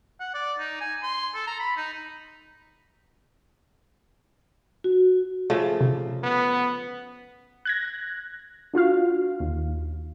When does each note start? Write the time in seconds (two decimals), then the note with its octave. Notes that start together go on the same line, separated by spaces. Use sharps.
0.20 F#5
0.34 D5
0.59 D#4
0.81 G#5
1.03 C6
1.35 A4
1.47 A#5
1.60 B5
1.77 D#4
4.84 F#4
5.50 C#3 F3 A3
5.81 C3
6.23 B3
7.65 F#6 G#6 A#6
8.74 D4 F4 F#4 F5
9.40 D#2